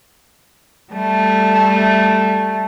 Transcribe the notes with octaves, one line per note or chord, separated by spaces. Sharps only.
G3 A3